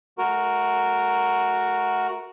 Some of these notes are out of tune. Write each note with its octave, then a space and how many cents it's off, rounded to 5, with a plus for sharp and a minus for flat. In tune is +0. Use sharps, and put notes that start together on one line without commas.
A3 -30 F#4 +0 A#4 +0